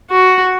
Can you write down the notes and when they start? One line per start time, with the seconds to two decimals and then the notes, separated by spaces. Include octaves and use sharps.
0.11 F#4